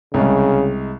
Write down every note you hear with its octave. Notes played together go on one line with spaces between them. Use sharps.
C2 C#3 G#3